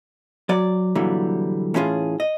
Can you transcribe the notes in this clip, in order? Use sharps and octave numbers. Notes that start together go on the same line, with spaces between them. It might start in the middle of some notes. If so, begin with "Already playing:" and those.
F#3 D5
A#2 D3 E3 F#3 G3
A2 E3 C#4 F4 G#4
D#5